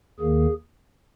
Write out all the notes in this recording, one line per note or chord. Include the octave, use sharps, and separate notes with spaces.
D#2 D#3 A#3 G#4